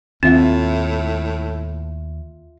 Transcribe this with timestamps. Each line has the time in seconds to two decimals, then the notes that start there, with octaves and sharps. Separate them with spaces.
0.23 D#2 A2 C4 F4 E5 F#5